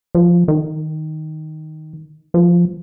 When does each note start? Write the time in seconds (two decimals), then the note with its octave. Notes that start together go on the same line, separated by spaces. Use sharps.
0.15 F3
0.48 D#3
2.34 F3